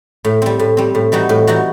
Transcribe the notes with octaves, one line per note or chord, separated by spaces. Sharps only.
A2
G3 C4
A2
G3 C4
A2
E3 G3 D#4 F#4
A2
E3 G3 D#4 F#4